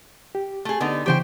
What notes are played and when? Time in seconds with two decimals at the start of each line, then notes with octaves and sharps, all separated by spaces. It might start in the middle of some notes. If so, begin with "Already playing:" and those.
0.35 G4
0.65 A3 G#4
0.80 D3 B3 D#4
1.06 C#3 E3 G4 C5 G5 C#6